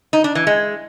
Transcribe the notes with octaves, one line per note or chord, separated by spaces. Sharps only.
D#4
D4
E3
G#3